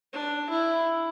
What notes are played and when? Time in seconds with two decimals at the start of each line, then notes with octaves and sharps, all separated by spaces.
0.13 D4
0.49 E4